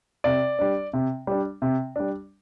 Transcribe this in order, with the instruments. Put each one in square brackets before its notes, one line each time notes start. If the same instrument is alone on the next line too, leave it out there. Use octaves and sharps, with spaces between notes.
[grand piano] C3 D5
G3 D4
C3
G3 D4
C3
G3 D4